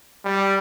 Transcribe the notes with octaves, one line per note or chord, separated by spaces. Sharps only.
G3